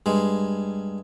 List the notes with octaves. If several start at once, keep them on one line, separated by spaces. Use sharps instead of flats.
G2 G#3